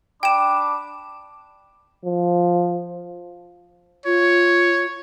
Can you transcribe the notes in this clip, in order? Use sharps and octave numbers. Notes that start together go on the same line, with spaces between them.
D4 G5 B5 D6 E7
F3
F4 C#5